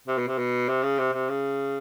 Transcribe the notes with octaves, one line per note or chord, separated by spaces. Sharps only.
C3
B2
C3
B2
C3
C#3
C3
C3
C#3